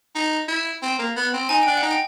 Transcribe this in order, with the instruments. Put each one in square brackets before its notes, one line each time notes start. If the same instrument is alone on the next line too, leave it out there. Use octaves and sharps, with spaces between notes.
[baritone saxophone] D#4
E4
C4
A#3
B3
C4
[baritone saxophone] D#4 [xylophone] G#5
[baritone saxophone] D4 [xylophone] G5
[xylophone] F#5
[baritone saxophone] D#4
[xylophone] G5